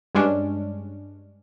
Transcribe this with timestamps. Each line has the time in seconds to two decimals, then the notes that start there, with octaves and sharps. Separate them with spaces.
0.15 G2 G#3 C#4 D4